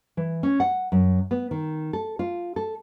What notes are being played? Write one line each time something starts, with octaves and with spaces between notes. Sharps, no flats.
E3
C#4
F#5
F#2
B3
D#3
A4
F4
A4